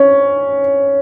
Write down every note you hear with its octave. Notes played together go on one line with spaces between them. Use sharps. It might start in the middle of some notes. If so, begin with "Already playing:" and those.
Already playing: C#4